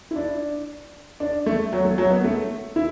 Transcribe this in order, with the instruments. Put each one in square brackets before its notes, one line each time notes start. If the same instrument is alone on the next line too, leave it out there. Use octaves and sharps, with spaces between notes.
[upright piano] E4
D4
D4
A3
F#3
A3
F#3
B3
A3
E4